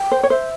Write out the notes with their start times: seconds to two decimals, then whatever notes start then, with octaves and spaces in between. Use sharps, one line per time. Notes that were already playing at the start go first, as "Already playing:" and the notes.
Already playing: G5
0.11 C5
0.23 C#5
0.30 C5 E5